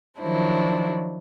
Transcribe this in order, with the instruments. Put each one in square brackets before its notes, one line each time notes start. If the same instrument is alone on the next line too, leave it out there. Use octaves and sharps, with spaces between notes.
[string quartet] D#3 F3 F#3 D4 E4 C5